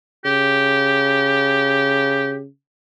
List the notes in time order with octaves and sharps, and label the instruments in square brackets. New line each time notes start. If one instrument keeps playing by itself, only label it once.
[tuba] C#3 [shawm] G4